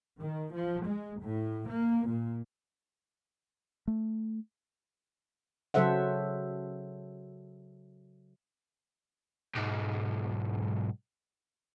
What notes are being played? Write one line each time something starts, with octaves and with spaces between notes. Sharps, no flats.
D#3
F3
G#3
A2
A#3
A#2
A3
C#3 F#3 A4 C5 E5 F#5
B1 G#2